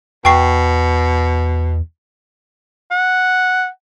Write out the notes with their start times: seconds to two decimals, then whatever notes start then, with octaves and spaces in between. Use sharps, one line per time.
0.25 E2 B2 G5 C#6 C7
2.91 F#5